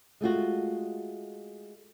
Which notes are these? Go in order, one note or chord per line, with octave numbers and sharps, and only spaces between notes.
G#3 A3 F4 F#4